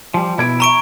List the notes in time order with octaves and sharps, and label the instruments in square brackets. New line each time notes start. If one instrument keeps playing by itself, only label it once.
[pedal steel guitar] F3 G3
[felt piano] B2 G#6 D7 [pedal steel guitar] E4
[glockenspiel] A#5 C#6 D7 [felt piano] D#7